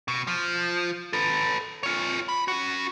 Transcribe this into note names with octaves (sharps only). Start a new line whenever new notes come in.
B2
F3
A4 B4
F4 C#5
B5
C#4 F#4